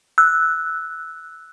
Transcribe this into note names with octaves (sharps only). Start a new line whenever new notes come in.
E6 F#6